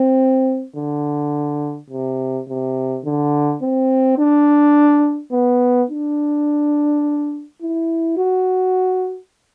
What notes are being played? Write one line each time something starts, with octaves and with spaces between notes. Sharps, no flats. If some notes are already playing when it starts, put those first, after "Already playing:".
Already playing: C4
D3
C3
C3
D3
C4
D4
B3
D4
E4
F#4